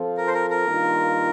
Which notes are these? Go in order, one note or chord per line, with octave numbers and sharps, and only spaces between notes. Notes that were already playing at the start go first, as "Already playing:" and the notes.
Already playing: F3 C4 F4 A4
A#4
C5
A#4
A#4
G2 D#3 A#3 F4